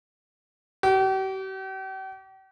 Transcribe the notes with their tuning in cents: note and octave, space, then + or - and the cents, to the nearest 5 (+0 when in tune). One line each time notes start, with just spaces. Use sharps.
G4 -45